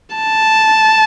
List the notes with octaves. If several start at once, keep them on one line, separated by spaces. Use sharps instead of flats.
A5